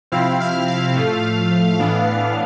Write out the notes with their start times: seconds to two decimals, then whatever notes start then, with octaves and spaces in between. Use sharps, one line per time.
0.12 C3 F3 C4 E4 F5
0.40 F5
0.68 F5
0.95 A2 F3 A3
1.79 A2 E3 B3 D4